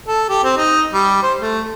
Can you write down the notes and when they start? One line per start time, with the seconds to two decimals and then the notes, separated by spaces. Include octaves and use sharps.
0.08 A4
0.29 G4
0.44 C4
0.57 D#4
0.93 G3
1.23 C5
1.41 A3